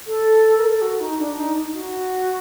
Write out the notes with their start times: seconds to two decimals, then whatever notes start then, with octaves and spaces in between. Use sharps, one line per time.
0.07 A4
0.58 A#4
0.63 A4
0.82 F#4
1.00 D#4
1.19 D4
1.37 D#4
1.56 D#4
1.74 F#4